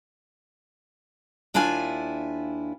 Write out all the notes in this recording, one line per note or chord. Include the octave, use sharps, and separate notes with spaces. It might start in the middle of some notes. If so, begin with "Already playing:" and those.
D#2 D4 E4 F4 G#5